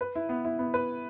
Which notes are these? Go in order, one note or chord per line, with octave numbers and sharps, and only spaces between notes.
B4
E4
B3
E4
B3
B4